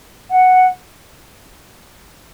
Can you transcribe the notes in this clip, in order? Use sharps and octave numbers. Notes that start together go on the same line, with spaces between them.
F#5